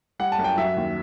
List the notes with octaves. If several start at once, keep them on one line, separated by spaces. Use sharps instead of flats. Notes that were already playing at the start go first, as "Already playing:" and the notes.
G3 F#5
A5
F#2
G5
F#3 E5
D#2